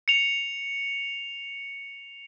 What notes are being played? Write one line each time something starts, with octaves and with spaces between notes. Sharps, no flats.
C#7 F7